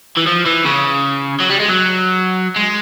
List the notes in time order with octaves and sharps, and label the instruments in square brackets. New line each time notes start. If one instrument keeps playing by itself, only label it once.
[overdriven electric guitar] E3
F3
E3
C#3
F#3
G3
G#3
F#3
G#3